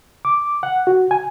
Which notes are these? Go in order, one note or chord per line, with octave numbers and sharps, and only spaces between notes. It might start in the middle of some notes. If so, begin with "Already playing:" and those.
D6
F#5
F#4
G#5